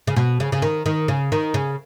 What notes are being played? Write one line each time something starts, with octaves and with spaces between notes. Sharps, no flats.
C#3
B2
C#3
C#3
D#3
D#3
C#3
D#3
C#3